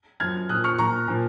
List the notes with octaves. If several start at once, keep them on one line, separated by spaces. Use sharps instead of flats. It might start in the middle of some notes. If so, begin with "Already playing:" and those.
F#2 F3 F6 G#6
A#2 F3 D#6 F#6
C#6 F6
A#2 F3 A#5 C#6
A#2 F3